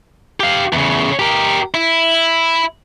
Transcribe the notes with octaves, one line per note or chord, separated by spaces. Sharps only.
G4 F5
E2 C#3
G4 A#4
E4